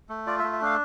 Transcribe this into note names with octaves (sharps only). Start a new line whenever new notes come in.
A3
F4 D5
E5
A3
E5
D4 F5